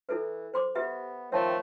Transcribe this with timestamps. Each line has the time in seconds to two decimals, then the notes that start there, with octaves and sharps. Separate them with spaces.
0.09 E3 E4 A4 B4
0.54 C5 C6 D6
0.75 B3 G4 B4 E5
1.32 D#3 F3 A3 C4 C#5 A5